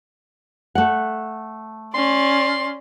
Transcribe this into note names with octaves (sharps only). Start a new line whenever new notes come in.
A3 F#5
C#4 D5 C6